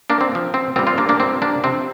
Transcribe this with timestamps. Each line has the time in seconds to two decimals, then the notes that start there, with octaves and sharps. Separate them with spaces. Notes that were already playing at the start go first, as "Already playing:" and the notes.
0.10 A#3 D4
0.21 C4
0.32 A#2 F3
0.54 C4
0.76 A#2 G3 C4 F4
0.87 C4 F4
0.98 A#3 D4
1.09 A#3 D4
1.20 A#2 G3 C4
1.42 A#3 D4
1.64 C3 F3 C4